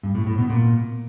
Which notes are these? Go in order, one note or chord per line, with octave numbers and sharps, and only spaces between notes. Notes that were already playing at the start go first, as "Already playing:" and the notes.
G2
A2
A2
B2
A#2